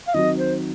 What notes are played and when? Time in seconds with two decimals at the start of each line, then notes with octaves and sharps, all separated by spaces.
0.07 F5
0.14 D#3 F#3 C4 F#4 D#5
0.38 C5